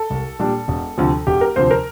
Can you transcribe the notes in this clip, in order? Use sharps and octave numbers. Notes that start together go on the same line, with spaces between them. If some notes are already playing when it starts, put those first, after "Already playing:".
Already playing: A4
C2
A#2 G3 D4
E1
D2 C3 F3
E1 G4
A#4
D2 C3 F3 C5
A#4